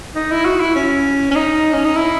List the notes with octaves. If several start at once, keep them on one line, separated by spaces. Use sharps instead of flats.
D#4
E4
F#4
E4
C#4
C#4
D#4
C#4
D#4
E4